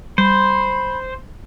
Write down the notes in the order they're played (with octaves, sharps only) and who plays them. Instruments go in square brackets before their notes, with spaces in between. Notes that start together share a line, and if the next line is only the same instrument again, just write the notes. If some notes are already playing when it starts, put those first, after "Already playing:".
[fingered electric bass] G3 [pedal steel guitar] C5 [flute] B5